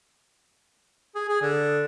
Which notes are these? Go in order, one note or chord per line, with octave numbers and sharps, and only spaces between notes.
G#4
G#4
D3